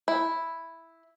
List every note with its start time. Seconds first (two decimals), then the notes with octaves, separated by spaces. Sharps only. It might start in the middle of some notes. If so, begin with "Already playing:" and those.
0.08 E4